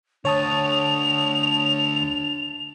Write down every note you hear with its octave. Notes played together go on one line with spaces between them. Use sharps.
D2 D4 C#5 A5 D#6 F7